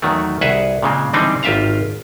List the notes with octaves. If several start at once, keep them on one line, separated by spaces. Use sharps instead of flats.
E2 D#3 F#3 A3
C2 G#4 B4 E5 F#5
A#2 C#3 G#3 C4
D3 E3 G3 C4 D4 D#4
G#1 F4 G4 E5 F5 A#5